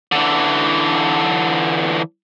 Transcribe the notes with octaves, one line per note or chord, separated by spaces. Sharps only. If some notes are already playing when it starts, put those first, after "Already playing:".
D3 E3